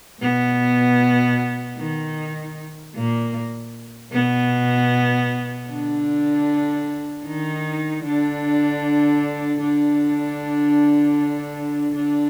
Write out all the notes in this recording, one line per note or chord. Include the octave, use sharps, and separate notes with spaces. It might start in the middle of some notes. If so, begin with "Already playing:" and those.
B2 B3
D#3 D#4
A#2 A#3
B2 B3
D3 D4
D#3 D#4
D3 D4
D3 D4
D3 D4